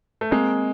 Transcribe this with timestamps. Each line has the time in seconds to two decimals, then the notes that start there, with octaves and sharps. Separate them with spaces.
0.21 A3
0.31 G#3 A#3 C4